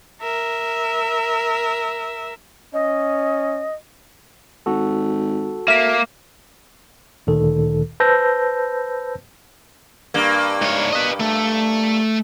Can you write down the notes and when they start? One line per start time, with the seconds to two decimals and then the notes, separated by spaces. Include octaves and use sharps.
0.22 A#4 E5
2.73 C#4 D#5
4.66 G#1 F#4 A4
5.68 A#3 E5 B6
7.27 D2 A#2 D#3 A4
8.00 B4 C5 A5 E6 G6 A#6
10.14 G2 A#3
10.62 G#2 C#5
10.93 B4 D#5
11.20 A3